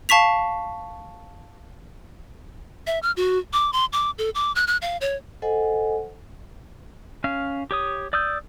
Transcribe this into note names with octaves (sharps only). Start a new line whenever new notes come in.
F5 A5 C#6 B6 F7
E5
F6
F#4
D6
C6
D6
A4
D6
F#6
F#6
F5
C#5
A4 C5 D#5 F#5 G#5
C#4 F5
G4 C#5 D#6
D5 D#6 E6 G6